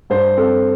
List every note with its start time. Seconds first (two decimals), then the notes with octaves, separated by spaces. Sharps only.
0.10 G2 C5
0.37 C4 A4